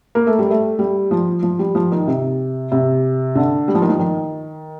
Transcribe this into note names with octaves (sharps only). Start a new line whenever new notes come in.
A#3
A3
G3
A3
G3
F3
F3
G3
F3
D#3
C3
C3
D3
G3
F3
D#3
F3
D#3